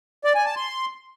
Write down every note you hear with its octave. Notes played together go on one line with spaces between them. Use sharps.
D5
G#5
A5
C6